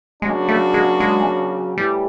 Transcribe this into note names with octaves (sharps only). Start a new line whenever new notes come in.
C#3 F#3 G#3 A#3 D4 F#4
A3
G#3
G#3
A2 E3 G3